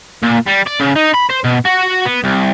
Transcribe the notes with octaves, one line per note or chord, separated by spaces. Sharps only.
A#2
G3
D5
C#3
D#4
B5
C5
B2
F#4
B3
C2